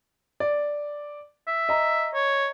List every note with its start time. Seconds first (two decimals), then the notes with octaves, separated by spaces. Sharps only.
0.40 D5
1.47 E5
1.69 D#5 A#5
2.14 C#5